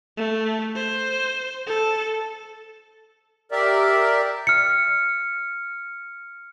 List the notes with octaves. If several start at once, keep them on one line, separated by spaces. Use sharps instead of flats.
A3
C5
A4
G4 A#4 D5 E5
F6 C#7